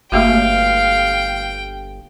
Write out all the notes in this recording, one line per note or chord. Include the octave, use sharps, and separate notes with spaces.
G1 A3 A#3 F#4 F5 G5